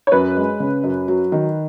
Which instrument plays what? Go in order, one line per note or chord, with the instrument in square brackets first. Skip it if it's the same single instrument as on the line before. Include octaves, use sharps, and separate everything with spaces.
[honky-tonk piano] C#5
[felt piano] F#2 [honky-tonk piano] B4
[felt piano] G#3
C#3
F#2
F#3
D#3